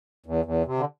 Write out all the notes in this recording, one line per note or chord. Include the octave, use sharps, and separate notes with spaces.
E2
E2
C3
D3